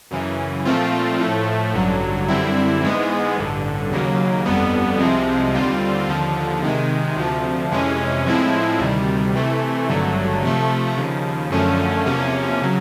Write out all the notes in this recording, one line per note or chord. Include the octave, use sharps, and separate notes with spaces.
F#2 C#3 E3
A#2 F3 A3 C4 F4
A2 F3 A3
A1 G2 D3 F#3
F#2 D3 G3 C4 E4
G#2 E3 G#3 B3
A1 G2 D3
D#2 C#3 F#3 A#3
G1 F2 D3 G3 B3
C2 C3 F3 G#3 C4
D#2 D3 G3 C4 F4
D#2 D3 F3
C3 D#3 G#3
D2 C3 F3
F2 C3 E3 G#3 C#4
A2 F3 G#3 C4 E4
D2 C3 D#3 G3
C3 E3 A3
G#1 G2 D3 F#3 A3
C3 F3 A3
D#2 C#3 F3
F#2 D3 F3 A3 C#4
E2 C3 F3 A#3 C#4
C#3 F#3